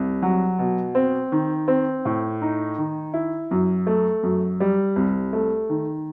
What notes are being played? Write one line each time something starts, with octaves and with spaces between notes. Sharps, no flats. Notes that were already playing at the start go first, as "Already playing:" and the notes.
Already playing: C2
F#3
B2
C4
D#3
C4
A2
D#4
D#3
E4
F#2
A3
F#2
G3
C2
A3
D#3